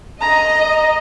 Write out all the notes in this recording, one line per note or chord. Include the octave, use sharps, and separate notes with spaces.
D#5 A#5